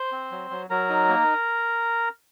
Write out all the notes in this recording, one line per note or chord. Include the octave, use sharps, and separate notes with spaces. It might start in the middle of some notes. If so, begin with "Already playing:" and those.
Already playing: C5 C6
C4
F#3
F#3
F#3 A#4 A#5
D#4
A#3